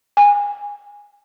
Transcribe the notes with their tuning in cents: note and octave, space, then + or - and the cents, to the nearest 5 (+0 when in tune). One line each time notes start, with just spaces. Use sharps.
G#5 -20